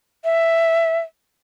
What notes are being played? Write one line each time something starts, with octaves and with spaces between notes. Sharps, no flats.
E5